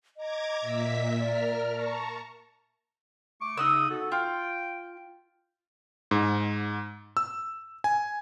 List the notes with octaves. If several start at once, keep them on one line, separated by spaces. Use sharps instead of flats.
D#5 A#5 D6 G#6
A#2 E5 B6
A#4 D5 F6
A5 A#5 C#6
A3 C#6 D6
C#3 D#4 F#5 D#6 E6
B3 F#4 A4
F4 G5
G#2
E6
G#5